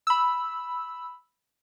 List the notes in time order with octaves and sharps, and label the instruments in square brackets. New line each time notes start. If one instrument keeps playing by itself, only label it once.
[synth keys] B5 E6